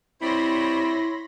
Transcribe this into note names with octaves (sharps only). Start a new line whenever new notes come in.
G3 C4 E4 C#5 B5 C6 A#6